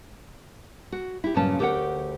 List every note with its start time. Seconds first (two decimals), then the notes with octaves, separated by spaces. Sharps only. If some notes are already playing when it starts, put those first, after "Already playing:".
0.92 F#4
1.24 E4 G4
1.35 G2 A#2 C#3 F#3 C#4 A5
1.59 D2 G4 A#4 C5 C#5 F#5